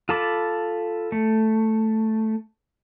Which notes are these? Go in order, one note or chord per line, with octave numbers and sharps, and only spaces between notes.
F4 A4 A5 B5 D6
A3